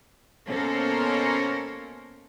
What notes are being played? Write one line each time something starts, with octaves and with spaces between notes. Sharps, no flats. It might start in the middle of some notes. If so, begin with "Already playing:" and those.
B2 A#3 C#4 A4 A#4 C5